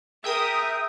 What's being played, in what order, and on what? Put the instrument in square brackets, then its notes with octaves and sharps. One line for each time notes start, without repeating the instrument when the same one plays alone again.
[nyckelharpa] G#4 A#4 [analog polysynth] E5 G5 D#6